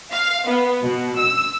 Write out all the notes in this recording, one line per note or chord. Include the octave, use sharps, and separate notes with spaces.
F5
B3
B2
E6